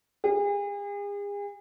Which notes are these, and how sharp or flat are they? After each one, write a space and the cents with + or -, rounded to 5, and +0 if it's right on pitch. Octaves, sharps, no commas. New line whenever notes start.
G#4 -40